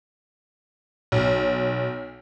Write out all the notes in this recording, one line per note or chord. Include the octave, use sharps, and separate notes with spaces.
B1